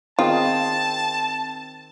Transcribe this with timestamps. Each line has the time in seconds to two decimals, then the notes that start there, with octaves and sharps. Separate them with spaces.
0.19 D#3 C4 F4 G#4 A5